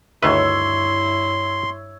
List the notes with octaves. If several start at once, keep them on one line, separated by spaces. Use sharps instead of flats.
D2 G2 D#3 E4 B4 C#5 E5 C6